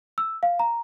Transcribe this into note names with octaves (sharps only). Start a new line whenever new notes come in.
E6
F5
A#5